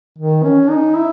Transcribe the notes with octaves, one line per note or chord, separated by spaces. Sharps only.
D#3
C#4
D#4
E4